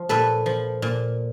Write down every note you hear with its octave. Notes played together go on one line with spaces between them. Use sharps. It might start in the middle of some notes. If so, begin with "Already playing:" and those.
Already playing: F3
A#2 A4 B4
F3
A#2